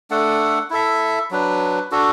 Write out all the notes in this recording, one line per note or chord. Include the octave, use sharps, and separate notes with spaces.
A3 D4 A4 F#5
E4 A4 E5
F#3 D4 B4
D4 F#4 A4